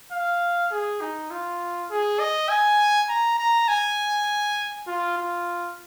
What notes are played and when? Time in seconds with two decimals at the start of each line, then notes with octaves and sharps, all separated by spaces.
0.12 F5
0.71 G#4
1.01 D#4
1.31 F4
1.90 G#4
2.20 D#5
2.49 G#5
3.09 A#5
3.39 A#5
3.68 G#5
4.87 F4
5.17 F4